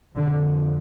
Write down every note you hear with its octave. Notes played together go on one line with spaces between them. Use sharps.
F2 D3